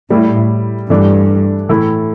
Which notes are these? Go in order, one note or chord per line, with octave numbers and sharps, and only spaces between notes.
A2 G3 E4 G4
G2 E3 A3 D4
A2 E3 A3 E4 A4